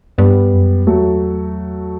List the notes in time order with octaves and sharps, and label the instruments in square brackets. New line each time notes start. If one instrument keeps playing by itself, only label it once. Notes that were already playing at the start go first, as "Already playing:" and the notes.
[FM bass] G2 [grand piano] G3 B3
[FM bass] F#2
[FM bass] E2 [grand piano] F#3 A3